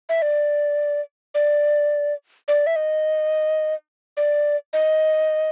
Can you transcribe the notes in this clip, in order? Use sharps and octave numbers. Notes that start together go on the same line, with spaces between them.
E5
D5
D5
D5
E5
D#5
D5
D#5